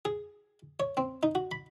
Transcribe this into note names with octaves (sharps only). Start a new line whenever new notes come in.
G#4
C#5
C4
D#4
F#4
B5